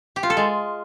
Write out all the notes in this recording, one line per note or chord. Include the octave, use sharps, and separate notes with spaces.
G4
F4
A4
G#3